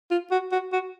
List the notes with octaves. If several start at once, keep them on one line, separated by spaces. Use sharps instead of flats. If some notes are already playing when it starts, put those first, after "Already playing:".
F4
F#4
F#4
F#4